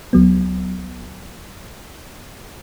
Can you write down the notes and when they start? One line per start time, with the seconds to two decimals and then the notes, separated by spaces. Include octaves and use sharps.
0.13 C#2 F#3 B3